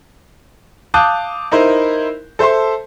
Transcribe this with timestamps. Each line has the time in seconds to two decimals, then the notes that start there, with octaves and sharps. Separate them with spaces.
0.94 F5 A5 D6 D#6 F#6 G6
1.52 D#4 E4 A#4 C5
2.39 A4 C5 E5 A5 C6